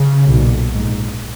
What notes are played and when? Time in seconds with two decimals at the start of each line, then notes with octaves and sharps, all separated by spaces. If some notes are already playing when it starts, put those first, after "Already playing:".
Already playing: C#3
0.30 B1 A#2
0.73 A#1 G#2